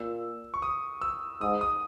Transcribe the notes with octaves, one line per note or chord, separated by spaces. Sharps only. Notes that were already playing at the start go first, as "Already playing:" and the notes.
Already playing: A#2 E6
C#6
D#6
E6
G#2 D#6
D#6